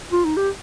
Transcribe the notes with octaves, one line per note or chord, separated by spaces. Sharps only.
F4
D#4
G4